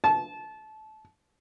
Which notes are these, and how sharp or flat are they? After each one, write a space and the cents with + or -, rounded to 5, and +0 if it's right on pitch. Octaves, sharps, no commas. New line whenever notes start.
A5 -25